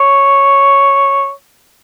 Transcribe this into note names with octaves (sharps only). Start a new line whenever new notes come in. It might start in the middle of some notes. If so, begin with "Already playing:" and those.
Already playing: C#5